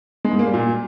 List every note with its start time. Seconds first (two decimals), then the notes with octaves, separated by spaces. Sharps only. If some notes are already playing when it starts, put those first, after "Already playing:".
0.25 G#3
0.32 G#2
0.39 A#3
0.46 G3
0.54 A#2